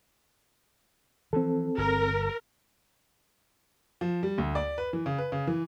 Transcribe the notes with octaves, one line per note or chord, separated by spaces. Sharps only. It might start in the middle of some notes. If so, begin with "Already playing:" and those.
E3 F3 C4 A4
G1 A#4
F3
G3
D2
D5
B4
E3
C#3
B4
C#3
E3